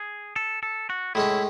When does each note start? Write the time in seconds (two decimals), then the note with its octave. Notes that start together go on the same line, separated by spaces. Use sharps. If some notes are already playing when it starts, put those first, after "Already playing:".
Already playing: G#4
0.36 A4
0.63 A4
0.90 F#4
1.15 A2 G#3 C#4 E4